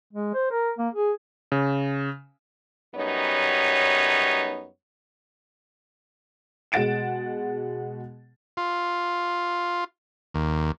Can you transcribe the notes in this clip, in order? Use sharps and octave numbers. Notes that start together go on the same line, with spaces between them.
G#3
C5
A#4
A#3
G#4
C#3
F#2 G3 B3 D#4 C#5
B2 G#3 F#5 A6 D7 E7
F4
D#2